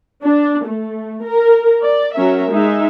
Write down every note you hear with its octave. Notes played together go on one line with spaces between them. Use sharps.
D4
A3
A#4
D5
F#3 C#4 A#4 E5
G#3 D#4 E5